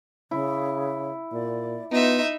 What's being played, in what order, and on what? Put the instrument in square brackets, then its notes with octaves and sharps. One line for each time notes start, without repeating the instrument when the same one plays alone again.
[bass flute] C#3 [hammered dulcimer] E4
[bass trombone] A#2 [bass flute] D5
[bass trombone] B3 [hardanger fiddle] D#4 E5 [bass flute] F4